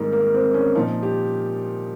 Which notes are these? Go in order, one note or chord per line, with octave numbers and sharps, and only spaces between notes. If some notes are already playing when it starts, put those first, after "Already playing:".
Already playing: G#2 D#3 G3 A#3 C4
A#3
C4
C#4
A#2 F3 D#4
G4